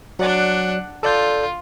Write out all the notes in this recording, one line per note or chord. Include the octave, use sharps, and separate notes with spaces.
F#3 D4 D5 F#5
F4 A4 D5 G6